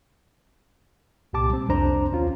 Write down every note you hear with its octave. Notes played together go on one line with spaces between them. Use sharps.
C2 A#2 G4 A5 D6
G3 C4
C2 F2 D4 C5 A#5
D#2 C#4 F4